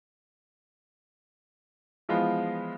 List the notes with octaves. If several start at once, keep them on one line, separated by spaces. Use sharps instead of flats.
E3 F3 G#3 B3 F4